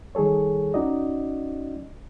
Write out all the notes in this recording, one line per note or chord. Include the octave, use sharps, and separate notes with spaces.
D#3 G3 G#4 A4 C#5
C#4 D#4 F#4 D5 D#5